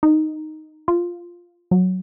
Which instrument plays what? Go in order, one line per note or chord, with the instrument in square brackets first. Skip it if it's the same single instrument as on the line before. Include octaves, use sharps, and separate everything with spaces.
[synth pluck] D#4
F4
F#3